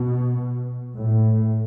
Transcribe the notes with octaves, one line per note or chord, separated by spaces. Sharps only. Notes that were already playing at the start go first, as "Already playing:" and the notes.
Already playing: B2
A2